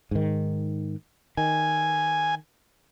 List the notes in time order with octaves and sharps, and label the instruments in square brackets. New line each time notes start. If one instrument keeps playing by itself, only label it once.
[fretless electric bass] G#2 D#3
[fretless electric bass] D#3 [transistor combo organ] G#5